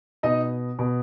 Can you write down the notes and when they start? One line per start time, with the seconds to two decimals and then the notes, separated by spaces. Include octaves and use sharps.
0.23 B2 D#4 D#5
0.79 B2